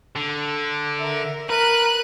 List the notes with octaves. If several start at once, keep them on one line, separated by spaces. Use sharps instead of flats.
D3
A#4 E5
A#4 B4 F#6 D#7